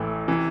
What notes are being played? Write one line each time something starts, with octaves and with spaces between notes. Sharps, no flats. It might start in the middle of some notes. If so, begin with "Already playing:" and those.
Already playing: A1 A2 E3 A3
C3 E3